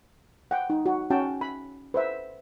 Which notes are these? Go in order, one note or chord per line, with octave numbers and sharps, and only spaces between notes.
F#5 G5
D#4
F#4
C#4 F#4 G5 A5
B5
B4 C5 E5